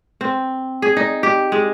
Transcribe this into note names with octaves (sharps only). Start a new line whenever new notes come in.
C4
G#4
D#4
G4
G#3